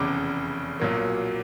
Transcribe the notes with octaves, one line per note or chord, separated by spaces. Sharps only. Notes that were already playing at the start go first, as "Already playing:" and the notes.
Already playing: F1 E2 C#3 D6
B1 A#2 F#3 A#3